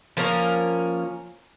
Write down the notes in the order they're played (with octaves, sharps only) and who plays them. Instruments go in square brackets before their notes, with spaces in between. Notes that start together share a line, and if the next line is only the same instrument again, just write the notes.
[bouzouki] F3 A#3 C#4 A#4